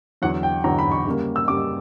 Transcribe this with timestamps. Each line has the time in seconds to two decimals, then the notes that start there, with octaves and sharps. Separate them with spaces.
0.22 E2 D3 F#3 F#5
0.43 G5
0.64 E2 D3 F#3 A#5
0.79 B5
0.91 C#6
1.07 C#3 G3 A#3
1.36 E6
1.48 C#3 G3 A#3 D6